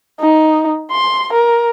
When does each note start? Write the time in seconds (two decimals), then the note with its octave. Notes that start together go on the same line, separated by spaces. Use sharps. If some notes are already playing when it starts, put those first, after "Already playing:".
0.20 D#4
0.91 C6
1.33 A#4